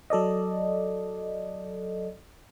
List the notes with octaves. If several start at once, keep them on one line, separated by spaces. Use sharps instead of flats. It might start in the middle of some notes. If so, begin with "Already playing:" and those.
F#3 A4 D5 D#5